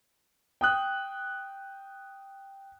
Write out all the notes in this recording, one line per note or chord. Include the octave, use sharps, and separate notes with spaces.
G5 D#6 F#6